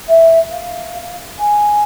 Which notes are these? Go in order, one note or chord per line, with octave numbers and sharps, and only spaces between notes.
E5
F5
G#5